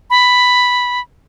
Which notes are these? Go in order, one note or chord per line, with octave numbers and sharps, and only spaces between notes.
B5